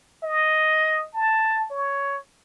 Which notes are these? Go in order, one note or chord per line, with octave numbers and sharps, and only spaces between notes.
D#5
A5
C#5